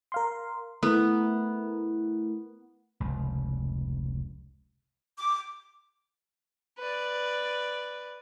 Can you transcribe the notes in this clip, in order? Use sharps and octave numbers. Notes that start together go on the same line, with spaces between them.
A#4 F5 C6
A3 B3 E4 A#4
F1 C#2
D6
B4 D5